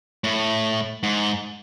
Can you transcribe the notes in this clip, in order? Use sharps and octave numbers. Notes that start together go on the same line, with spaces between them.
A2
G#2